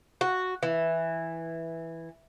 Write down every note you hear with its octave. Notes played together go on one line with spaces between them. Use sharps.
F#4
E3